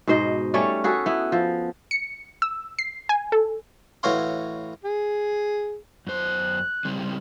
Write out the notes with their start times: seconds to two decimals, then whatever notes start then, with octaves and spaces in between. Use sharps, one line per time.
0.07 G#2 B2 C5 D#5
0.54 G3 A3 C#4 C#5
0.84 F#4 G#4 A4 B4
1.06 B3 E4
1.32 F3
1.91 C#7
2.42 E6
2.79 C7
3.09 G#5
3.32 A4
4.03 A2 E3 F#4 C#5 F5 C6
4.85 G#4
6.07 F#2 C5 F#6
6.85 C#3 G3 C4